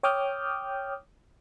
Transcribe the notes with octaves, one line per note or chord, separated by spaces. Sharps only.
C#5 G5 D6 D#6 F6 G6